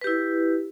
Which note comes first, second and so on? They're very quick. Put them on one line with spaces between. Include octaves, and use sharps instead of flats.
B4 G4 E4